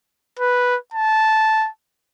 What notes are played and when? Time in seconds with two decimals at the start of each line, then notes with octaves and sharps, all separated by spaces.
0.39 B4
0.94 A5